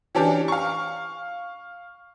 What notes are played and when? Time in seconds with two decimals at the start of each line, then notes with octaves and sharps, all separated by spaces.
0.15 E3 C#4 D4 G4
0.48 F5 C#6